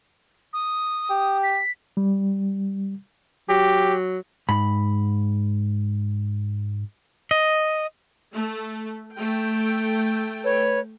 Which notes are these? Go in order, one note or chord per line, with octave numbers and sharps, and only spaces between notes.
D#6
G4
B6
G3
F#3 G4
G#2 B5
D#5
A3
A3 G5
B4 C#5